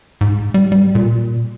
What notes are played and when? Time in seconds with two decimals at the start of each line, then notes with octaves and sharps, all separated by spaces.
0.21 G#2
0.54 G3
0.72 G3
0.95 A#2